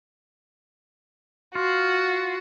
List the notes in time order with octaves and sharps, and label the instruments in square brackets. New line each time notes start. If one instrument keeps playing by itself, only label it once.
[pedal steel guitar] F4 [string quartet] F#4